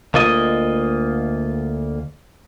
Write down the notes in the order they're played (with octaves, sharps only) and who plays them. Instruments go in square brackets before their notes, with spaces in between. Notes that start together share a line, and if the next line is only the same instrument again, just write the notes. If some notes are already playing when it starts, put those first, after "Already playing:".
[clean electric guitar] D2 A#3 F4 D#5